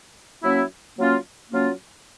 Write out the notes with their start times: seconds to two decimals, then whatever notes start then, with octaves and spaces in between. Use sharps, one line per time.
0.43 F#3 A#3 C#4 E4
0.97 F#3 A#3 C#4 F4
1.51 F#3 A#3 C#4 F4